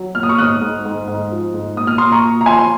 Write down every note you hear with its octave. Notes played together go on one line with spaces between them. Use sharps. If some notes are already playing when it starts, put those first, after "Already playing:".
Already playing: F#3
A#2 F6
D#6
C#6 F6
G#2 D#6 F#6
G#2
G#2
G#2
F3
G#2
A#2 D#6
F6
A#2 C6 D#6
A#5 C#6
A#2
A#5
F3 G#5 C6
C6